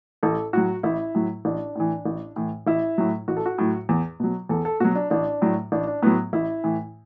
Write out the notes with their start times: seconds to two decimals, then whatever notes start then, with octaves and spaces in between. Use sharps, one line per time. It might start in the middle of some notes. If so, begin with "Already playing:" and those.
0.23 A1 A4
0.53 A2 F#3 F#4
0.83 A1 E4
1.15 A2 F#3
1.45 A1 D4
1.75 A2 E3
2.05 A1
2.36 A2 E3
2.67 A1 E4
2.98 A2 F#3
3.28 A1 F#4
3.37 A4
3.46 F#4
3.58 A2 F#3
3.89 E2
4.20 B2 F#3
4.49 E2 A4
4.65 A4
4.80 B2 F#3 F#4
4.95 D4
5.10 A1 D4
5.42 A2 F#3
5.72 A1 D4
5.87 D4
6.02 A2 F#3 B3
6.33 A1 E4
6.64 A2 E3